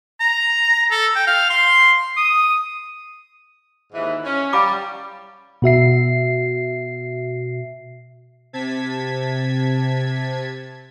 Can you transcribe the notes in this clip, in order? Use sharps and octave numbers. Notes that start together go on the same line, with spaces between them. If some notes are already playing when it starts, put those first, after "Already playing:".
A#5
A4
G5
F5
C6
D#6
D#2 G#2 E3
C#4
G3 F5 B5 D6
B2 F#4 E5 C7
C3 A5 G#6 B6